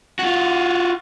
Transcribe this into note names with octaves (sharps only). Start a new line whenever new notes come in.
F4 F#4